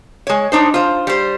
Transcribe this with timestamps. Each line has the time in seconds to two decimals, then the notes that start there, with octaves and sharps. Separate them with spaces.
0.27 G#3 C#5
0.52 D4 D#4 C5
0.74 F4 C5
1.07 G3 C5